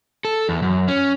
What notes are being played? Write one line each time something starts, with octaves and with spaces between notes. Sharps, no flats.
A4
E2
F#2
C#4